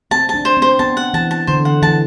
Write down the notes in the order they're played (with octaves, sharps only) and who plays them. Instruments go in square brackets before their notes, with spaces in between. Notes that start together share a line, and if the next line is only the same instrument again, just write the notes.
[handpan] C4 [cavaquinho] A5
[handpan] D4 [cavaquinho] A5
[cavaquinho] C5
[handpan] C4
[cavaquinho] C5
[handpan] B3 [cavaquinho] A5
[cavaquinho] F#5
[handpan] E3 [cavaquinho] A5
[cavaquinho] A5
[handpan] D3 [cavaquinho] C5
[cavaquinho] F#5
[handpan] E3 [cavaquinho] A5